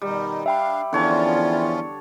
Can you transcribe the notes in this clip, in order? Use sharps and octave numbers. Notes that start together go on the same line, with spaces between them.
B2 D#3 G3 D#4
D4 E5 F5 G5 B5
E2 D3 F3 C#4 F4 C#5 A5